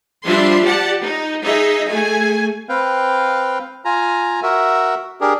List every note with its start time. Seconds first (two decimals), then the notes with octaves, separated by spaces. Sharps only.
0.25 F3 G3 D4 E5 C6
0.64 G4 D5 F#5 A5
1.02 D#4
1.41 D#4 G#4 D#5 E5
1.88 A3 G#4 G#5
2.69 C4 B4 F5 G5
3.85 F4 G#5 A#5
4.43 F#4 A#4 E5
5.21 D4 G4 G#4 A#4